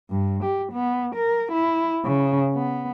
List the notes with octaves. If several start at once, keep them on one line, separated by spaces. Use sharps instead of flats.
G2
G4
B3
A#4
E4
C#3
B3